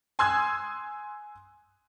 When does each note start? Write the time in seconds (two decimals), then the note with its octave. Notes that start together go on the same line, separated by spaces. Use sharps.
0.19 G#5 C6 D#6 E6 F#6 G#6